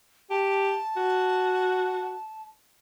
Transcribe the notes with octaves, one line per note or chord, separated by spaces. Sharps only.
G4 A5
F#4